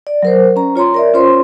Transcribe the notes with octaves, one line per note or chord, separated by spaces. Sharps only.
D5
F#3 A#4 C5
C#4 A#5
F4 C#5 A#5 C6
A#4 D5 E5
C#4 F4 C5 C#5 C6